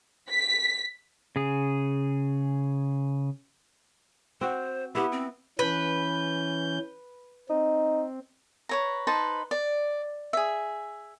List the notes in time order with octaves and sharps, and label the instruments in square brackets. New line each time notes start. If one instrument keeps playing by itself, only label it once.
[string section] B6
[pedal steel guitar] C#3 G#4
[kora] C4 F#4 [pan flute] C5
[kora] B3 E4 [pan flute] G4
[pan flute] C4
[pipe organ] E3 C#4 G6 [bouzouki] B4
[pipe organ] C4 [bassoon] D#4
[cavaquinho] B4 C#5 A#5
D#4 B4 C5 A5
D5
G#4 E5